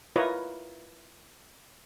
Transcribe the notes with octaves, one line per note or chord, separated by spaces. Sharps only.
E4 F4 A#4 B4 C#5 D#5